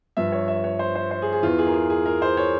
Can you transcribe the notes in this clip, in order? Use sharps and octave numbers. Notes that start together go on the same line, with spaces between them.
G2 F3 E5
C#5
E5
C#5
C5
C5
C5
G#4
G#4
E2 E3 F4
G#4
A#4
G#4
G#4
A#4
C5
C#5